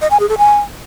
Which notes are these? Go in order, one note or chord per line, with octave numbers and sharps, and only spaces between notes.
D#5
G#5
G#4
A4
G#5